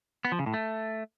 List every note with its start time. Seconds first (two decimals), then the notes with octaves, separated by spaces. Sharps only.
0.25 B3
0.32 F3
0.39 C#3
0.46 A2
0.54 A3